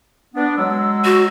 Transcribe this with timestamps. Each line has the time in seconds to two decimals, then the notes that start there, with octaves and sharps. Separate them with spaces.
0.35 B3 D4
0.57 F#3 G#3 E6
1.05 F#4